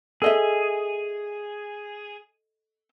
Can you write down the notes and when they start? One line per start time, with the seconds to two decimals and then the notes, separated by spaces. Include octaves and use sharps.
0.22 G#4 A4 D#5 E5